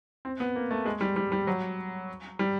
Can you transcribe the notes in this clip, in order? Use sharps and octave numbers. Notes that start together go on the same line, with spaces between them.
C4
B3
A#3
A3
G#3
G3
G3
G3
F#3
G3